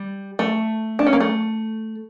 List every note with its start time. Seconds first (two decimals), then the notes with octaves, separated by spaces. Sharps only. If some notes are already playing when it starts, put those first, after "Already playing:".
Already playing: G3
0.39 A3
0.99 D4
1.07 C#4
1.13 A#3
1.20 A3